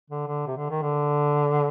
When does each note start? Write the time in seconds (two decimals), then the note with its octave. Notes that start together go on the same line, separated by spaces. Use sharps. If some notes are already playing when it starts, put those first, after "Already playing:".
0.10 D3
0.27 D3
0.47 C3
0.57 D3
0.70 D#3
0.82 D3